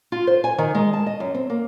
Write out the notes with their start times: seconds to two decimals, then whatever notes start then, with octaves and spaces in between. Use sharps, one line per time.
0.12 F4
0.27 C5
0.44 G#5
0.58 D#3
0.75 G#3
0.93 A5
1.06 D#5
1.20 F#2
1.34 C4
1.50 A#3